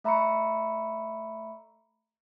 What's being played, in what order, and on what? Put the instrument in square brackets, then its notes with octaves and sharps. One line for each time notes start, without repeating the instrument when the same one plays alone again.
[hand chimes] A3 E5 A#5 B5 C#6 C#7